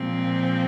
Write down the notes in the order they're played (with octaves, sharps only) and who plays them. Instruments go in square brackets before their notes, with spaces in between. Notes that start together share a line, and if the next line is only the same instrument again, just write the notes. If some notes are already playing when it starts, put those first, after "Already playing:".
Already playing: [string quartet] A#2 F3 G#3 C4